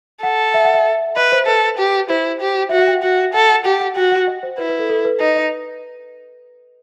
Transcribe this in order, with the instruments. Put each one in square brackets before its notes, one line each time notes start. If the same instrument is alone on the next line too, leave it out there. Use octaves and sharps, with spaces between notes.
[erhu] A4 [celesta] F#5
[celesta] E5
F#5
E5
[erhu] B4 [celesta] D#5
[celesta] C5
[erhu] A4 [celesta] B4
[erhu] G4
[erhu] E4 [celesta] C5
[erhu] G4
[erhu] F#4 [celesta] E5
[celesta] F#5
G5
[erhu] F#4 [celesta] F#5
[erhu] A4 [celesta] F#5
[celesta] F#5
[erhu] G4 [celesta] F#5
[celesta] F#5
[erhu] F#4 [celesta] G5
[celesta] F#5
D#5
C5
[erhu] E4 [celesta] B4
[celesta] B4
A4
A4
B4
[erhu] D#4 [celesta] B4
[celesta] D#5